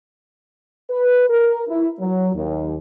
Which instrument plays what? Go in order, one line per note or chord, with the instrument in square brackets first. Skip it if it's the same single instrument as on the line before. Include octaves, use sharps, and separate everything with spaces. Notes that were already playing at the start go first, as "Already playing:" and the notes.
[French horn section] B4
A#4
E4
F#3
D#2